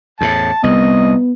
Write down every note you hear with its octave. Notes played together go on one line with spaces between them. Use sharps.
E2 A2 A5
C2 B3 D#5